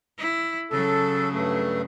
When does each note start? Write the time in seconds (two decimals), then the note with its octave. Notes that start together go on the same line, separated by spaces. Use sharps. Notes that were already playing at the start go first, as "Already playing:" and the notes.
0.19 E4
0.71 C#3 F#3 A4
1.32 G2 A3